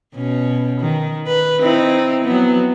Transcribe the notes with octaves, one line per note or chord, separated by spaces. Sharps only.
B2 C#4
D#3
B4
C4 D#4 E4
F#3 B3